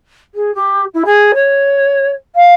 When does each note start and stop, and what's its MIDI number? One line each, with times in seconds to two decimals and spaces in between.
0.34 0.54 68
0.54 0.84 67
0.94 1.03 64
1.05 1.32 68
1.34 2.10 73
2.35 2.54 77